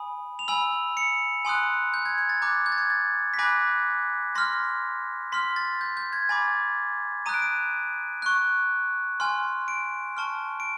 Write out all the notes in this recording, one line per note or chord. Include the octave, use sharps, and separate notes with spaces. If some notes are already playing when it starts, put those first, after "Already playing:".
Already playing: G#5 B5 D#6
F7
G#5 B5 E6 F#7
C#7
G#5 C6 D#6 F#6
G6
G#6
G#6
A6
A#5 D6 F#6 G6
G6
A6
G#6
A6
B6
G#5 B5 D6 F#6 A#6
C6 F6 A#6
C6 F6 B6
A6
G6
G6
G#6
G#5 B5 D6 A6
A#5 D#6 F#6 D#7
D7
D#7
C#6 F#6
G#5 C6 F6
D7
A5 C#6 F6
D7